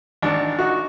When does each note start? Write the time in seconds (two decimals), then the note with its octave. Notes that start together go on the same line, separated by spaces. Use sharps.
0.22 G#1 D4
0.59 D#4 F#4